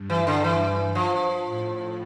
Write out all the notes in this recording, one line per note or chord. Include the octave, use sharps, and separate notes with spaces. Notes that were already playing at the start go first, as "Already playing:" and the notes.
Already playing: G2
E3
D3
E3
F3
A2